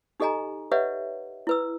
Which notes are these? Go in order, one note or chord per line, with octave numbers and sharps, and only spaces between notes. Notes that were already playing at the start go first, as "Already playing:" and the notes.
D#4 G4 A4 D#5 G#5 A#5
G4 B4 C#5 D#5 E5 F#5
E4 B4 E6